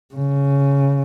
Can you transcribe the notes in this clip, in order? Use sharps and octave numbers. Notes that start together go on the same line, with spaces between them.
C#3